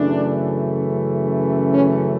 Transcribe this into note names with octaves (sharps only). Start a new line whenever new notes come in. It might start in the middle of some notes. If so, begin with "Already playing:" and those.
Already playing: F#2 C#3 E3 A3 D4
C#4